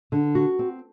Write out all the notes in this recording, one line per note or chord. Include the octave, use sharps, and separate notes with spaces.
D3
F#4
C4